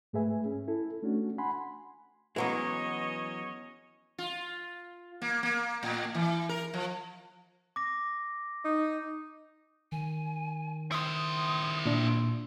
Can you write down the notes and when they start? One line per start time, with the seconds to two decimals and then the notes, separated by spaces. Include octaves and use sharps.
0.13 G#2 A3 G#4 B4 E5 G#5
0.46 C#4
0.68 E4 A4
1.03 A3 C#4 D4 F#4
1.38 F#5 G#5 B5 C6
2.36 E3 F#3 G#3 B3 C#4 C#5 D#5
4.18 F4
5.22 A#3
5.43 A#3
5.83 A2
6.15 E3
6.49 A#4
6.74 F3
7.76 D6 A#6
8.65 D#4
9.92 D#3 G#5
10.92 E4 C5 D#6
11.86 A#2 D4